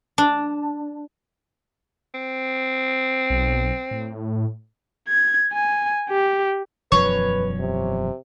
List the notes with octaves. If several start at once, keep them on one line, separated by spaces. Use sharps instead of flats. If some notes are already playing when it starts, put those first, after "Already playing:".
D4
C4
B1
A2
G#6
G#5
G4
E1 F#2 F3 B4 C#5
C3